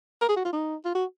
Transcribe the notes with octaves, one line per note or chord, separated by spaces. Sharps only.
A#4
G#4
F#4
F4
D#4
F4
F#4